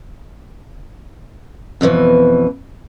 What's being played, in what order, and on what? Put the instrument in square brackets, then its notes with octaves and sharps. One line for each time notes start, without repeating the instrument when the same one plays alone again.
[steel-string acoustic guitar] F2 B2 D3 E3